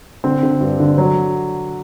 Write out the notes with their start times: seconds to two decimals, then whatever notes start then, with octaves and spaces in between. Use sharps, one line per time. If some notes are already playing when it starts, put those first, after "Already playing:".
0.24 D3 C4
0.43 D3
0.61 G2
0.80 D3
0.98 F#3